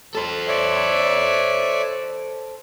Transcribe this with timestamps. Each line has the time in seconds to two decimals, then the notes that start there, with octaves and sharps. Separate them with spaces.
0.15 A4 C5
0.48 C#5 D5 E5